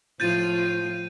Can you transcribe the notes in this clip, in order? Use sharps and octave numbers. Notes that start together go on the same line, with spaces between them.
A2 F3 F4 G6 A6 D#7